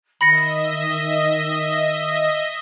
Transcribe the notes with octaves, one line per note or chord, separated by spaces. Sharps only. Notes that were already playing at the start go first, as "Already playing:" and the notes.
D#3 D#5 E5 B5 A#6 C#7